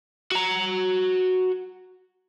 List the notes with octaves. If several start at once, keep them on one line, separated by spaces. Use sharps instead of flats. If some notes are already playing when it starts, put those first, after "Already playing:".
F#4 A#5